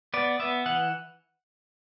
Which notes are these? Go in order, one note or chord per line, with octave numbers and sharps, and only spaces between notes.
B3 D5
B3 E5
E3 F#5